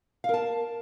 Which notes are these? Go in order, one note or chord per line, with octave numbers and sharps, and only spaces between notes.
A#4 F5 A5